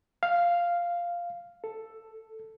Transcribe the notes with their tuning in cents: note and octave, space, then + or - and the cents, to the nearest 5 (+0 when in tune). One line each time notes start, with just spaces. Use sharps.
F5 -5
A4 +5